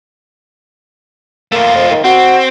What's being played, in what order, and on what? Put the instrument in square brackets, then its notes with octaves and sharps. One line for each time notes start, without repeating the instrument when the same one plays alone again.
[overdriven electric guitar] A3 F4 [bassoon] A#3
[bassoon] F2
D#3
[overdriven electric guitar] C4 [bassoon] F#4